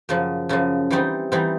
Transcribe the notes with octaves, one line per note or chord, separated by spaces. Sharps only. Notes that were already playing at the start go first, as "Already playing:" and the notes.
F#2 C#3 F3
F#2 C#3 F3
E3 G3 C4 D#4
E3 G3 C4 D#4